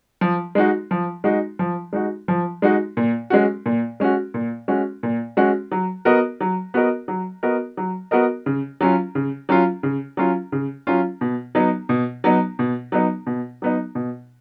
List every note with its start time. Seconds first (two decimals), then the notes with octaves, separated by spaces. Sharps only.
0.21 F3
0.55 G#3 D#4 F#4
0.91 F3
1.24 G#3 D#4 F#4
1.59 F3
1.93 G#3 D#4 F#4
2.28 F3
2.62 G#3 D#4 F#4
2.97 A#2
3.30 G#3 C#4 F#4
3.66 A#2
4.00 G#3 C#4 F#4
4.34 A#2
4.68 G#3 C#4 F#4
5.03 A#2
5.37 G#3 C#4 F#4
5.72 F#3
6.05 B3 F#4 A#4 D#5
6.41 F#3
6.74 B3 F#4 A#4 D#5
7.08 F#3
7.43 B3 F#4 A#4 D#5
7.77 F#3
8.11 B3 F#4 A#4 D#5
8.46 C#3
8.81 F#3 C#4 F4
9.15 C#3
9.49 F#3 C#4 F4
9.83 C#3
10.17 F#3 C#4 F4
10.52 C#3
10.87 F#3 C#4 F4
11.21 B2
11.55 F#3 B3 D#4
11.89 B2
12.24 F#3 B3 D#4
12.59 B2
12.92 F#3 B3 D#4
13.27 B2
13.62 F#3 B3 D#4
13.95 B2